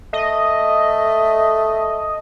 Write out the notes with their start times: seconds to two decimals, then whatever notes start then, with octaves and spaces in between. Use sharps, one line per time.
0.13 A3 D#5